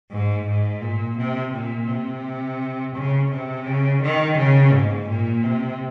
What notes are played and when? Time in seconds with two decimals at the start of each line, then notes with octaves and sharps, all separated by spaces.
0.11 G#2
0.47 G#2
0.82 A#2
1.18 C3
1.54 A#2
1.89 C3
2.95 C#3
3.31 C3
3.66 C#3
4.02 D#3
4.38 C#3
4.73 G#2
5.09 A#2
5.44 C3